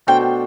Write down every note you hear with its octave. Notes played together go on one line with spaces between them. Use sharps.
B2 A3 D4 F#4 C5 G5